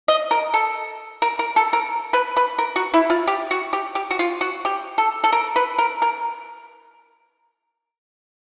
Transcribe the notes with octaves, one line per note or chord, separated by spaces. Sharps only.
D#5
A#4
A4
A#4
A#4
A4
A#4
B4
B4
A#4
F#4
E4
F4
G4
F#4
G4
G4
F#4
F4
F#4
G4
A4
A4
A#4
B4
A#4
A#4